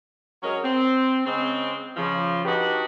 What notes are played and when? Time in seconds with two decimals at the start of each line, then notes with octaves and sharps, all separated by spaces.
0.43 F#3 G#3 C#4 A#4
0.63 C4
1.25 C#3 G#3 C4
1.97 C#3 F3
2.45 D4 D#4 F#4 G4 B4